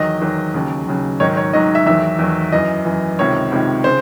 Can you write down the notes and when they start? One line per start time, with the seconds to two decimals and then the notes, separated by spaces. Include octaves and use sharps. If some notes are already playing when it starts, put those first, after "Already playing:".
Already playing: E2 D#3 F#3 D#5
0.21 E2 D#3 F#3
0.54 D#2 C#3 F#3
0.87 D#2 C#3 F#3
1.20 G#2 D#3 F#3 C#5
1.37 C#5
1.53 G#2 D#3 F#3 D#5
1.75 E5
1.86 E2 D#3 F#3 E5
2.19 E2 D#3 F#3
2.52 F#2 E3 D#5
2.85 F#2 E3
3.19 C#2 C3 D#3 C#5
3.52 C#2 C3 D#3
3.84 C#3 C5